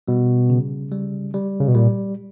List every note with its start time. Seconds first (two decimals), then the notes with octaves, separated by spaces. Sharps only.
0.08 B2 G3
0.50 C#3
0.92 G3
1.34 G3
1.60 C#3
1.68 B2
1.75 A#2 G3